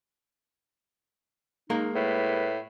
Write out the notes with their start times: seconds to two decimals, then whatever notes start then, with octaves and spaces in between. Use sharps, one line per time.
1.70 G#3 A#3 D#4 A#4
1.95 A2 B4